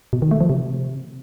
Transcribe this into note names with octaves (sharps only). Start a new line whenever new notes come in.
B2
D#3
A3
F3
C3